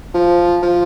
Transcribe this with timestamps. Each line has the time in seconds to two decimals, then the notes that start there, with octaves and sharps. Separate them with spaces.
0.14 F3
0.63 F3